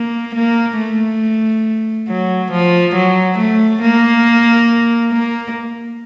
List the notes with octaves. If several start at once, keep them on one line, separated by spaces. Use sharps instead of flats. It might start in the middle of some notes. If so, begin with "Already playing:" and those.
Already playing: A#3
A#3
A3
F#3
F3
F#3
A3
A#3
A#3